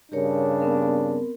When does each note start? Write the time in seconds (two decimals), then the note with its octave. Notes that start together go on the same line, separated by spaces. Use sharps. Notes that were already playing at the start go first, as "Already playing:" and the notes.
0.12 G2 C#3 D4 G4 A#4 C#5
0.60 B3 C4 A#4